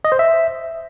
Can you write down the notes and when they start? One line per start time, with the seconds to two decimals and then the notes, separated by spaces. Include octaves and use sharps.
0.05 D#5
0.12 C5
0.19 E5